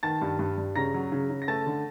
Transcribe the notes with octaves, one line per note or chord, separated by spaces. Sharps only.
D#3 A5 A6
G2
G2
G2
C#3 A#5 A#6
F#3
C#3
C#3
A#6
A3 A5 A6
D3